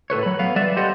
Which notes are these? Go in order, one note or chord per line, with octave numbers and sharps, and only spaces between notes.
A2 A4 B4 C#5
F#3 B5
B3 F5
G3 B4 D5 E5
G4 A4 C5 D#5 F#5